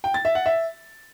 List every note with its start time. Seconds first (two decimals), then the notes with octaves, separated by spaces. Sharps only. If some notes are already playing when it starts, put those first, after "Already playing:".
0.04 G5
0.14 A6
0.25 E5
0.35 F#5
0.46 E5